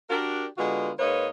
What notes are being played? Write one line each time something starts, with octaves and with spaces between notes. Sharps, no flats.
D4 F#4 G4 A#4
D3 G#3 B3 F4 F#4
G#2 A#3 D#4 B4 C#5